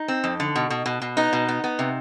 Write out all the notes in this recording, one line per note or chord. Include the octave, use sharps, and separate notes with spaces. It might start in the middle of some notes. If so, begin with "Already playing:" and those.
Already playing: D#4
C4
F2
D3
B2
B2
B2
B2
B3 D#4
B2
B3
B3
C3